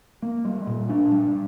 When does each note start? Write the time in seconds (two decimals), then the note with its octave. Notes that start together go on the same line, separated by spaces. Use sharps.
0.22 A#3
0.45 G3
0.67 A#2
0.89 D4
1.12 G3